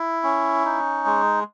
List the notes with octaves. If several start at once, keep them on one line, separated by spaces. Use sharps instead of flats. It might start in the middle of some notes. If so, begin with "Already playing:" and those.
Already playing: E4
C#4
D#4
G#3